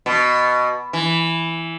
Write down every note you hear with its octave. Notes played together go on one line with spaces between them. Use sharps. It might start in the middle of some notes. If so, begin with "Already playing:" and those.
B2
E3